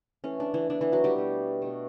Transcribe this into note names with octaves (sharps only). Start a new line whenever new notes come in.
E3 A3 C#4
D4
E3 E4
E3 B3 D4
E3 E4
F#3 F#4
G3 G4
B2 A3
B2 A3